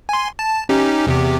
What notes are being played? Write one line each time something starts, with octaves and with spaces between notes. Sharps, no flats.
G#5 C6
A5
C#4 D#4 G4
E2 C3 G4